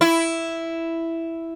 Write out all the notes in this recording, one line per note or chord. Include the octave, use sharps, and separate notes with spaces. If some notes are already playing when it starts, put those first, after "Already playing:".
E4